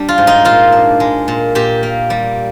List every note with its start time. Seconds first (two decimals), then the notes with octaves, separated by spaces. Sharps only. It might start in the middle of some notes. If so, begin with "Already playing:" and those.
Already playing: G3 D4
0.08 F4
0.18 G#2
0.27 D#4
0.45 A#2 F4
0.72 D4
1.00 G#3
1.28 A#2
1.55 A#2 G4
1.83 A#3
2.10 G3